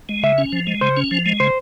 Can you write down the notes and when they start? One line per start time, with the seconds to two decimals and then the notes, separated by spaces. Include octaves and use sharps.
0.09 G#3
0.23 C#3 E5
0.38 C#4
0.52 F3
0.67 G#3
0.81 C#3 C5
0.97 C#4
1.11 F3
1.26 G#3
1.40 C#3 C5